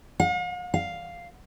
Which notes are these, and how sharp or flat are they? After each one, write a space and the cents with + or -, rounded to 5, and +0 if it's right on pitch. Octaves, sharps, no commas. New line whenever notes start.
F5 +45
F5 +0